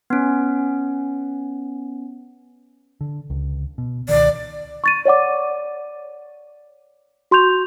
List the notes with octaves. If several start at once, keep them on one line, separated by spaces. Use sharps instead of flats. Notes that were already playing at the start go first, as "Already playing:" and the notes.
B3 C#4
D3
C#2
B2
C#2 B2 D#3 D5
C#6 A6 D#7
C#5 D5 F#5 D6
F#4 C6 C#6 G6 F7